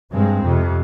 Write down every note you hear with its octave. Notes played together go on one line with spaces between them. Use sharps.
G2 G#3 C4
F2 C3